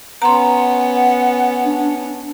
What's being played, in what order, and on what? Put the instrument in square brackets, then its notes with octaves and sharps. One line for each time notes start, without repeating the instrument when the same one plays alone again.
[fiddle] B3 C#4 [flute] F#5 [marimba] A#5 C6
[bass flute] D4